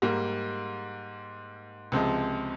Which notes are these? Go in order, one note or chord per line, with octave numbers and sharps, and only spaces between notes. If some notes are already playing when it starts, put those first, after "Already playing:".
G#2 G3 A#3
C#2 C3 F3 G#3